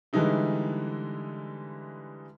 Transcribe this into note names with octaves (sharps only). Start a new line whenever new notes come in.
D3 E3 G3 G#3 D#4 E4